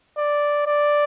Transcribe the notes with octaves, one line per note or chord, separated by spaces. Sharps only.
D5
D5